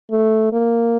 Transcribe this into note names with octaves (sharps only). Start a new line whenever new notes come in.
A3
A#3